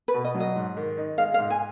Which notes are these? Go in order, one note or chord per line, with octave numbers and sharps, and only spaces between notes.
B4
B2
D#5
F#3
D#5
G#2
D#3
D#4
G#3 F5
F5
G#2
G#5